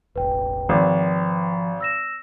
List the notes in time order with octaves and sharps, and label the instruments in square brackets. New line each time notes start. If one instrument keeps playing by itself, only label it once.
[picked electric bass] E1 A1 [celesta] B4 G5
[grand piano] G#1 [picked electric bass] F3
[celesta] E6 A#6 E7